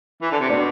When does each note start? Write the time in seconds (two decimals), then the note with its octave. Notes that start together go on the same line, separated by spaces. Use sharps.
0.22 E3
0.32 D3
0.40 C3
0.50 B2 D4